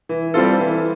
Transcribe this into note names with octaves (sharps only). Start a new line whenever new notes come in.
E3
G3 C4 F4 A4
E3